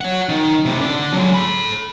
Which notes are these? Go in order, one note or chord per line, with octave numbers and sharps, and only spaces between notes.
C#5 F#5
D#3
A2 C3
D3 D4
F#3 G#3
A4 B5